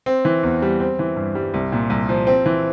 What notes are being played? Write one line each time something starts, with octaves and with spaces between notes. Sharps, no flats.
C4
E3
E2
G3
C4
E3
G2
G3
C2
A#2
C2
F3
C4
E3